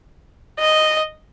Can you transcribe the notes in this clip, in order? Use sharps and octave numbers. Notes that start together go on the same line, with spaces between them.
D#5